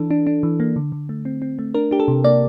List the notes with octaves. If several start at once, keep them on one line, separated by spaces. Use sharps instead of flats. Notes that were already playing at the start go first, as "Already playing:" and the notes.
Already playing: E3 D4 A4
D4
D4
E3
A#3
D3
D3
A3
C4
C4
A3
D4 A#4
D4 G4
A4
C3
A#3 D5